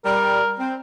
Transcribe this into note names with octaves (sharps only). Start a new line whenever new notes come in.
G3 A#4
C4